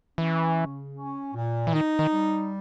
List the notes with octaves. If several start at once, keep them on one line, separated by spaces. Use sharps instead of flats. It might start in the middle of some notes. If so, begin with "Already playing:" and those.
E3 C#4
C#3
C#4
A#2
E3
D#3 D#4
D#3
G3